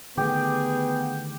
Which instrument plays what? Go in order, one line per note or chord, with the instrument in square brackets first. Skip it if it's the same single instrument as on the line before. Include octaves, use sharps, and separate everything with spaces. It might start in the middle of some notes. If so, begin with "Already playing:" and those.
[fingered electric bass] D3 D#3 A3 [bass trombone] B3 [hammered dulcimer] G4 [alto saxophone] G#4